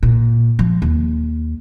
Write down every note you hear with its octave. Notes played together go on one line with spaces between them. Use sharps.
A#2
F3
D#2